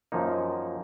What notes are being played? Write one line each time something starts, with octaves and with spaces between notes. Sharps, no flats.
F#2 F3 A#3 D#4